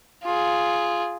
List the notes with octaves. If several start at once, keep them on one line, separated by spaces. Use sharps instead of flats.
F4 G#4